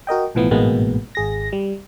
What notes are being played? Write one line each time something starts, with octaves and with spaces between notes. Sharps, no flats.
F#4 A#4 D#5 G5
B1 A2 E3 F3 B3
A1 G#2 B2 G#3 A#3 B3
G#1 G#4 A#6
G3